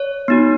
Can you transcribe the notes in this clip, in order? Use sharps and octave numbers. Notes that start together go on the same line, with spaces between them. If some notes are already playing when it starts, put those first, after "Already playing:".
Already playing: C#5
B3 D#4 F#4